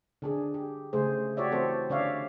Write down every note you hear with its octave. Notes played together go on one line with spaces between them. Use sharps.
D3 D4 G#4
G4
C#3 A3 G#4 C5
F#4 G4 C#5 D5 E5
E3 C4 A4 C5
D3 C#4 C#5 D5 E5 F5